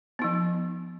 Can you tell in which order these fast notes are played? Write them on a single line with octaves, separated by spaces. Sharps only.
B3 D#4 F3